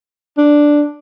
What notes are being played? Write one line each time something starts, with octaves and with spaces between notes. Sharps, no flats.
D4